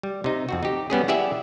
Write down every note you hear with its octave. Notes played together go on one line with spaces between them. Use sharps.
G3
C3 D#4
F2 C4 F#4
D#4 G4
G3 B3 C#4 G#4
E4 G4 G#4 D5 E5 F#5